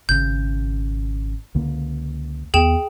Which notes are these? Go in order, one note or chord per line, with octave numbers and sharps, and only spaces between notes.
G#1 C#3 G6
C#2 D3 A#3
D#2 B3 G#4 G5 E7